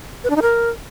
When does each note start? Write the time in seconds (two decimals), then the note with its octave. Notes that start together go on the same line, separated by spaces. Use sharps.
0.24 B4
0.30 D4
0.36 D#4
0.42 A#4